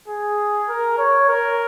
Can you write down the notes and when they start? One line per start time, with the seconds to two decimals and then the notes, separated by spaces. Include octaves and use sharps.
0.08 G#4
0.69 A#4
0.98 C#5
1.29 A#4